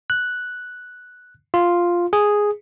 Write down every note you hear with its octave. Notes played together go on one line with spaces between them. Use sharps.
F#6
F4
G#4